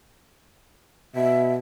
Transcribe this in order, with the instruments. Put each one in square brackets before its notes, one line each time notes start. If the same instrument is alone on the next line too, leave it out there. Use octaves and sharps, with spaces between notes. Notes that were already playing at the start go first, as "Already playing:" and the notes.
[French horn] B2 [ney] E5